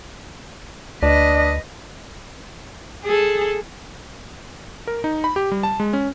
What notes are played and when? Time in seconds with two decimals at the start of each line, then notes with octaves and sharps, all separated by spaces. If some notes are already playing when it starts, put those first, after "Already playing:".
1.02 D2 D4 B4 D#5
3.04 G#4 A4
4.87 A#4
5.04 D#4
5.24 B5
5.36 G4
5.52 G3
5.63 A5
5.80 G#3
5.93 C#4